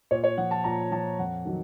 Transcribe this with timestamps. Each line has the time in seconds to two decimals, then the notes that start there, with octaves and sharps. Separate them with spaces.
0.11 A#2 C#5
0.24 C#5
0.37 F3 F#5
0.51 A5
0.64 A#2 A#5
0.91 F3 A5
1.19 F2 F#5
1.45 D#3 F#3